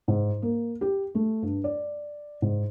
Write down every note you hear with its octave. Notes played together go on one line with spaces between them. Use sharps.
G#2
A#3
G4
A3
G2
D5
G#2